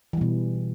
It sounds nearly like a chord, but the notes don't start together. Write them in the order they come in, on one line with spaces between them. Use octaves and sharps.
E3 G3 B2